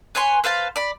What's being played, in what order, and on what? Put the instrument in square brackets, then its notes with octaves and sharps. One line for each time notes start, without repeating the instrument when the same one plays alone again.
[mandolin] B4 C#5 G#5 C6
B4 C5 F5 A5
D5 B5